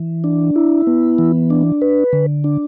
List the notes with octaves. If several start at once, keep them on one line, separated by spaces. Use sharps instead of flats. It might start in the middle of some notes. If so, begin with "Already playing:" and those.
Already playing: E3
D4
E4
B3
E3
D4
B4
D3
D4